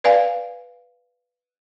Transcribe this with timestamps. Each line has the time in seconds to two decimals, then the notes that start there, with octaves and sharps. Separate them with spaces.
0.04 B4 D5 F5 G#5